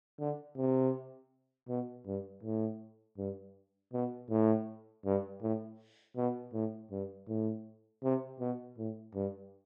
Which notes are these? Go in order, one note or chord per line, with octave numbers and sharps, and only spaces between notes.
D3
C3
B2
G2
A2
G2
B2
A2
G2
A2
B2
A2
G2
A2
C3
B2
A2
G2